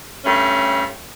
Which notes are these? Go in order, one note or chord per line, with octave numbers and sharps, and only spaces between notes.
G2 A3 C#4